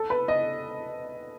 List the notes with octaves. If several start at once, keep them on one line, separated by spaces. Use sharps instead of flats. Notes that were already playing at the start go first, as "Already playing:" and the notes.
Already playing: A4
B4
D#5